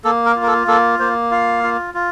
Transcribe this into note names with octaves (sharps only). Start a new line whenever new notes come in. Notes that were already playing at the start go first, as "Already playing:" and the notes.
A#3 A4
A#4
F4
A#4
A4
A#3 A4
A#3 C5
F4 F5
F4
F4